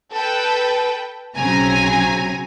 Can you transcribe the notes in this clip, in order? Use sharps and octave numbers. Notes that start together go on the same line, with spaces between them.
A4 B4 G5
B1 C#3 F#3 C4 G#5 A#5